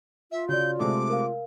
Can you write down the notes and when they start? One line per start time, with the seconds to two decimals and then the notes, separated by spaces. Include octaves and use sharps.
0.32 F4 E5
0.49 C#3 F#4 D5 G6
0.79 C3 G#3 A3 D6
1.10 A#4 F5